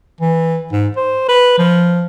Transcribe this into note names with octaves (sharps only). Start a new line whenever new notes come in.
E3
G#2
C5
B4
F3